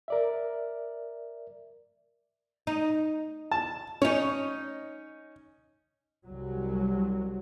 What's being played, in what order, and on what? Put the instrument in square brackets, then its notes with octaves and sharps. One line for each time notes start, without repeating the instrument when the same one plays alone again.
[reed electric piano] A#4 D5 E5
[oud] D#4
[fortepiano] A5
[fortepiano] C#4 [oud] D#4 C#5
[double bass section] C2 F#3